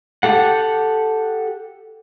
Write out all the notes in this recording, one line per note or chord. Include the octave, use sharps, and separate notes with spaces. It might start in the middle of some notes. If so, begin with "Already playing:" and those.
G4 A4 F#5